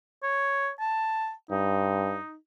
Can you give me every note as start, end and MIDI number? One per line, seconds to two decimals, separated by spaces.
0.23 0.70 73
0.80 1.33 81
1.51 2.18 43
1.51 2.35 63